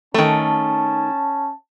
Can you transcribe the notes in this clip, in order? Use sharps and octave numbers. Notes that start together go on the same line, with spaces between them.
D#3 A3 C#4 A5